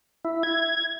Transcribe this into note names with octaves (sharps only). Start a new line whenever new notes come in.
E4
G#6